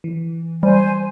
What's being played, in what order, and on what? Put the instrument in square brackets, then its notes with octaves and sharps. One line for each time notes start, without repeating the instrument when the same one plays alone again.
[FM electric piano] E3
[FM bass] G3 [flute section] C5 G#5